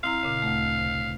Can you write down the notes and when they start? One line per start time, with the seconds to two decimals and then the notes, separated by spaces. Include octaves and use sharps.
0.04 C4 E4 F5 A#5
0.23 A#2 C#3
0.42 D2 A3
0.78 C3